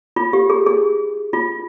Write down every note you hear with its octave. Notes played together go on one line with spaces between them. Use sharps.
F4
G4
G#4
G#4
F4